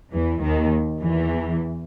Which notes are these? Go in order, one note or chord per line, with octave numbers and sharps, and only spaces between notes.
E2 E3
D#2 D#3
E2 E3